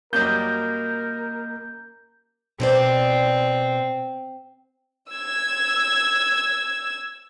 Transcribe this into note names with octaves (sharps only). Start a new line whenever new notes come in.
F#2 F#3 G3 A#3 A#4 D#5 G6
B2 C4 C5 D5
E6 G#6